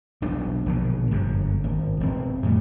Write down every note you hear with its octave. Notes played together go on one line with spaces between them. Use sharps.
E1 B1 D4
A#1 B2 D3
G1 F#2 D3
G#1
E1 C4
F2 A2 G3